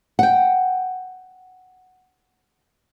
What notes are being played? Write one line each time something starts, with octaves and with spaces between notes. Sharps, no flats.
F#5 G5